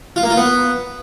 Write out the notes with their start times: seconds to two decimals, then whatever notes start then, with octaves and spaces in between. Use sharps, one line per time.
0.16 F4
0.23 A#3
0.30 F4
0.37 B3